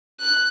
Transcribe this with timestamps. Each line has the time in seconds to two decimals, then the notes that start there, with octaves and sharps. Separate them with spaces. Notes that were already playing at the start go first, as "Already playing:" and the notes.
0.20 F#6